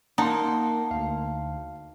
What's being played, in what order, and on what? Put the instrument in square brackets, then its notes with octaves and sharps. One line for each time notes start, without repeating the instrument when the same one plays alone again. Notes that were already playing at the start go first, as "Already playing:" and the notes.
[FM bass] A#3 [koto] D#4 [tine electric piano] F#5 C6 [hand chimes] A5
[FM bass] D2 [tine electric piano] F5